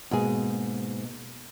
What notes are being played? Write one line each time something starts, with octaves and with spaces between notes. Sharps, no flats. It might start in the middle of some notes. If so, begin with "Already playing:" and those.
G#2 B2 A#3 B3 G#4